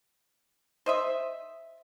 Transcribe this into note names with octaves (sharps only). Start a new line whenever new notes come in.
C5 D#5 E5